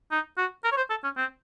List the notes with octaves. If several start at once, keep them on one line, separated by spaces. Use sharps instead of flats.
D#4
F#4
A#4
C#5
C5
A4
C#4
C4